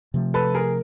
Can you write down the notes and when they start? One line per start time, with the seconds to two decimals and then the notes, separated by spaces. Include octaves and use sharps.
0.14 C3 F3 A3
0.34 A4 B4
0.54 G#4 A#4